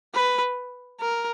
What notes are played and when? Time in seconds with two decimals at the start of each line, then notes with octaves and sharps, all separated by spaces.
0.14 B4
1.01 A#4